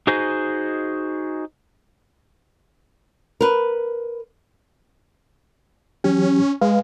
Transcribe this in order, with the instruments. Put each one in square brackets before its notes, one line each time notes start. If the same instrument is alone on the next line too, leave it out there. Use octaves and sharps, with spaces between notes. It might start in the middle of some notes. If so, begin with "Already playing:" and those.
[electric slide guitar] D#4 F#4 G#4 C5 D#5
[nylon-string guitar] A#4 B4
[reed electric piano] E3 F#3 G4 [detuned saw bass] C#4
[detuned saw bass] G#3 [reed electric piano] B4 F5